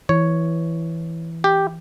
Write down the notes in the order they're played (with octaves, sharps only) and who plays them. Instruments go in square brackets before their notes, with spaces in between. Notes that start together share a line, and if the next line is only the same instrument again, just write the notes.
[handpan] E3 [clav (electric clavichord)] C#5
[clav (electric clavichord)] G4